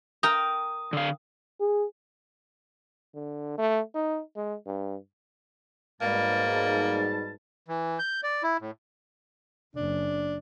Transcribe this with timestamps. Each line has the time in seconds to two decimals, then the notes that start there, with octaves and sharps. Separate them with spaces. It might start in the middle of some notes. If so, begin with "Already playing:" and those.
0.23 A#4 G5 A#5 D#6
0.93 D3 F5
1.60 G#4
3.15 D3
3.58 A3
3.95 D#4
4.36 G#3
4.66 G2
6.01 G#2 B2 G3 A#3 A5
7.68 E3
7.99 G6
8.23 D5
8.43 E4
8.61 A2
9.76 F#1 D4